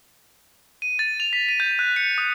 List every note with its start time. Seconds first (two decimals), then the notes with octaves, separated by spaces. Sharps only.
0.82 D#7
0.99 A6
1.20 F7
1.33 B6
1.49 D#7
1.60 G6
1.79 F#6
1.96 C#7
2.18 D#6